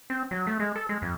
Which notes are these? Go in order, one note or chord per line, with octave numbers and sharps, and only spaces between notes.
C4
F#3
A3
G#3
A4
G#3
F2